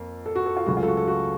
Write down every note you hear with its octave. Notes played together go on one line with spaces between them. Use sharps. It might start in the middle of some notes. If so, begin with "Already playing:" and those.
Already playing: F2 A#3
A4
F#4
A4
F4
C#2 C#3 F#3 A3 F#4
F4
A4
F#4
A4
F#4